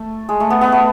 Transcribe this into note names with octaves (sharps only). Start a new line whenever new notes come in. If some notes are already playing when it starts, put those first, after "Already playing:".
Already playing: A3
G#3
A3
B3
B3
A3